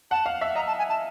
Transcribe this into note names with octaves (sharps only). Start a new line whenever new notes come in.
F#5 A5
F5
E5
D#5 A#5
A5
G#5
A5